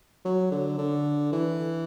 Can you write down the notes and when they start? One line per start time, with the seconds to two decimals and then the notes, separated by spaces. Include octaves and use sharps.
0.25 F#3
0.52 D3
0.78 D3
1.32 E3